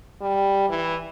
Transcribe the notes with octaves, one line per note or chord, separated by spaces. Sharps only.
G3
E3